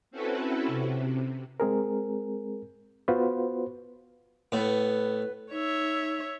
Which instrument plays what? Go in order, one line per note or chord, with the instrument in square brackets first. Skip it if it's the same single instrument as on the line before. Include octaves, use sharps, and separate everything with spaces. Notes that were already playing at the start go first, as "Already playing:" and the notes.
[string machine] C4 C#4 E4 F#4 A4 B4
C3
[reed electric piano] G#3 C4 G#4 A#4
B3 F4 F#4 B4 C5
[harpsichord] A2 [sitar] B3
[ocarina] D#4 [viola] C#5 E5